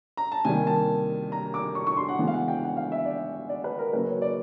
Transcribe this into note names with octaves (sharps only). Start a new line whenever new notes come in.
A#5
A5
C3 D#3 G3 A#3 G#5
A5
A#5
D6
C#6
C#6
C6
F#5
C#3 E3 G#3 B3
F5
F#5
G5
F#5
F5
E5
D5
D5
B4
A#4
C#3 F#3 A#3 B4
C#5
D5